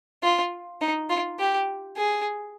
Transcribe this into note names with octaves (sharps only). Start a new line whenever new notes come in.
F4
D#4
F4
G4
G#4